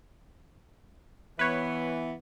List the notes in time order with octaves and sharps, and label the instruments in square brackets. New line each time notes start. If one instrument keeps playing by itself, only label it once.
[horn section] E3 B3 [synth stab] B4 C#5